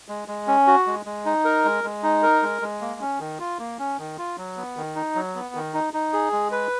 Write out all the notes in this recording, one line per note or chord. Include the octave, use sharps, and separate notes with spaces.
G#3
G#3
C#4
F#4
G#3
G#3
D#4
A#4
G#3
G#3
D#4
A#4
G#3
G#3
A#3
C#4
D#3
F4
A#3
C#4
D#3
F4
F#3
B3
D#3
D#4
F#3
B3
D#3
D#4
D#4
G#4
G#3
B4